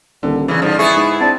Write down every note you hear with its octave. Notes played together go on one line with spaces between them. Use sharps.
D#1 D3
A#2 C#3 E3
G#2 D3 F3
B3 E4 G#4 E5 C#6
G#2
C4 D4 A5